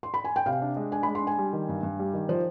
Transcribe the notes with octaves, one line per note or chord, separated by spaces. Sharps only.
C6
B5
G#5
G5
C3 F5
D4
G#3
D4 G#5
G#3 B5
C6
D4
G#5
G3
D#3
G2
G2
G3
D#3
F3 C5